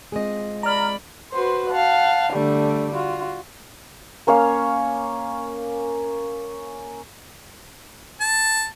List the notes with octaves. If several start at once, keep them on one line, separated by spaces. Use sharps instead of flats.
G#3 C4 F4 G#4 D#5
D5 A#5 B5 F6
F#4 B4 C5 C6
F5 F#5 A5
D3 G3 A3 D4
F4 F#4
A#3 C#4 C#5 F5
A5